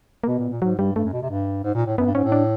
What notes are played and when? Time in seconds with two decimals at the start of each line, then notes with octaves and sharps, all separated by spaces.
0.24 A#3
0.28 B2 B3
0.39 A#2
0.50 A#2
0.62 G#2 F#3
0.78 G2 G3
0.96 G2 A3
1.05 F#2
1.13 B2
1.22 C3
1.30 G2
1.64 G#2
1.75 A#2
1.87 A2
1.98 F#2 B3
2.06 G2
2.15 G#2 C#4
2.24 A2
2.32 D4